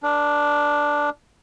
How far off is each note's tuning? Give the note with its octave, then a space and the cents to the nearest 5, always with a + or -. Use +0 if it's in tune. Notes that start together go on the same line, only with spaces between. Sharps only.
D4 +0 A#4 +30